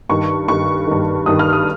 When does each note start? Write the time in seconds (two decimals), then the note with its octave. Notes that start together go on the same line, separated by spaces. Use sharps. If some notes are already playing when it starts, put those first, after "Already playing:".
0.09 G2 D#3 C#6
0.48 G2 D#3 C#6
0.87 G2 D#3
1.26 G2 D#3 D#6
1.39 F6
1.53 D#6